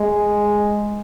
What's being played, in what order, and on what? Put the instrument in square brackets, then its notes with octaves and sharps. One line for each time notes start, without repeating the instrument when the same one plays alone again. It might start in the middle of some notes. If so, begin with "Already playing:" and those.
Already playing: [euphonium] G#3